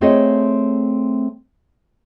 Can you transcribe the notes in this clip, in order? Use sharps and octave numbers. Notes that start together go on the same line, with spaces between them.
A3 C4 G#4 C#5 D#5